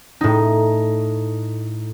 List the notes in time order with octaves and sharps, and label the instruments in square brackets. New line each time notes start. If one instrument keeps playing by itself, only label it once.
[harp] A2 D#4